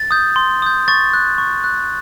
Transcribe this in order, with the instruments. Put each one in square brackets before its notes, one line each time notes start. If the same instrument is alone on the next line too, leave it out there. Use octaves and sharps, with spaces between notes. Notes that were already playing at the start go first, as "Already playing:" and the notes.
Already playing: [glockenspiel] A6
D#6 G6
C6
D#6 G6
C#6 A6
F#6
C#6
F#6